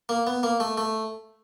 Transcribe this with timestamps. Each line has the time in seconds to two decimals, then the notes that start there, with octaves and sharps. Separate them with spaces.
0.09 A#3
0.27 B3
0.43 A#3
0.60 A3
0.78 A3